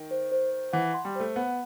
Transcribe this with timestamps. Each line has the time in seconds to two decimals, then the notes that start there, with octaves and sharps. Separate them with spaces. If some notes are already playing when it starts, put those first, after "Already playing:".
Already playing: D#3
0.11 C5
0.32 C5
0.52 C5
0.73 E3 F#5
0.94 C6
1.05 G3
1.16 A3 C5
1.36 B3 F#5